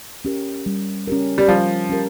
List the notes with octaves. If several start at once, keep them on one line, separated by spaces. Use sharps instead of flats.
C#4 G4 A#4
G3
C#4 G4 A#4
G3
F3 G3
C#4 G4 A#4